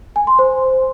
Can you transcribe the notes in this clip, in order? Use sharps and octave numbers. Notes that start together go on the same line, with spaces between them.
G#5
C6
C5